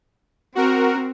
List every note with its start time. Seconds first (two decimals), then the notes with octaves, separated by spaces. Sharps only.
0.55 C4 F#4 A#4